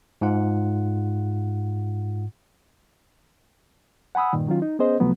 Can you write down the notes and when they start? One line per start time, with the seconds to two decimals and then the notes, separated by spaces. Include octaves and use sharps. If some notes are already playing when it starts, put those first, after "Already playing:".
0.21 G#2 F4 F#5
4.15 F#5 G#5 B5 D#6 E6
4.33 G2 A#2 D#3
4.47 D#3 F#3 C#4 F4
4.62 D#4
4.79 B3 C#4 G#4 C5 D#5
5.00 C2 C3 F3 F#3 A3 B3